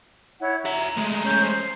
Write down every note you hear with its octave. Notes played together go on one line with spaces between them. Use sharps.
E4 C#5 F#5
F#4 E5 A#5
G#3 A3
C#4 A#5 G6
C5